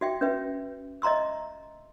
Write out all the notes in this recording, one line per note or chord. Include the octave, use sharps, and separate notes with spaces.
F#4 E5 G5
C#4 B4 E5
D#5 E5 A#5 C6 E6